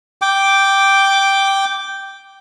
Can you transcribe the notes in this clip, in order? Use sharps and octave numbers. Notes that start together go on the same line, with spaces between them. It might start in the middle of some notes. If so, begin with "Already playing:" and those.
G5 D6